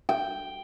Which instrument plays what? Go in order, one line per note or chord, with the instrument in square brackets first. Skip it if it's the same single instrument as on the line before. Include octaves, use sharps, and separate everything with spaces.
[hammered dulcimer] G5